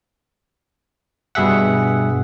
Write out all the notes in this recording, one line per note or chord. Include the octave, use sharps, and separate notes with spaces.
G2 B2 G#4 E5 F#5